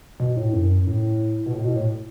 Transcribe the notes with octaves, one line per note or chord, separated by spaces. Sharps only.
B2
A2
A2
F#2
A2
B2
A2
B2
A2